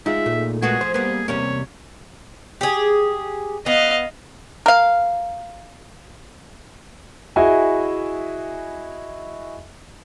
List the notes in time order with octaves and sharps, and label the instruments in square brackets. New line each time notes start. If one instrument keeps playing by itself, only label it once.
[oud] G#3 [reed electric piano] D#4 F4 G#4 [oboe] E5
[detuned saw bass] A#2 [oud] A3
[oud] G#3 B3 F#4 [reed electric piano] A3 [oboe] G#4
[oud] F3 [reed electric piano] C5
[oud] G3 B3 [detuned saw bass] A#3 [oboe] G#4
[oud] E2 G3 C#4 [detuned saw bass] C3 [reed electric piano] A#3 [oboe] C#5
[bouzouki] G4 G#4
[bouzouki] B3 [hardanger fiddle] D#5 F5
[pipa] A#4 F5
[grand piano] E4 F#4 G#4 D#5 E5 G#5